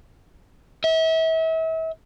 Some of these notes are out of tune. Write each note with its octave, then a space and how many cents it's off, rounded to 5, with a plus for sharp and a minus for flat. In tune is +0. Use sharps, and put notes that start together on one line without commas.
E5 -35